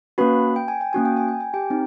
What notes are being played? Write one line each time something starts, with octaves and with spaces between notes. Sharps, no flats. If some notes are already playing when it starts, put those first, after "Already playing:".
A#3 C#4 F#4 B4 B5
G5
G#5
G5
A#3 C#4 F#4 G#5
G5
G#5
G5
G#5
G4 G5
C4 D#4